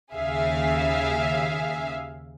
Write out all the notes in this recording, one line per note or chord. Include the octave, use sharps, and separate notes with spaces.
D#2 C#3 G#4 E5 F5